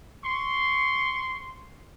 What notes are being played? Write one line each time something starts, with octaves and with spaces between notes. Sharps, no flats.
C6 C#6